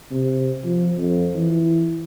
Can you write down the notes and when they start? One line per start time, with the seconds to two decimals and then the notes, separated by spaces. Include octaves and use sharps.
0.11 C3
0.65 F3
0.97 F2
1.35 E3